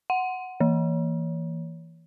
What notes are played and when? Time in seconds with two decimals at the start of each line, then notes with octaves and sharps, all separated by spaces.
0.10 F#5
0.60 E3